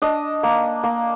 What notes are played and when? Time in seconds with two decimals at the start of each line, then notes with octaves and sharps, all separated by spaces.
0.02 D4 D#5
0.43 A#3
0.83 A#3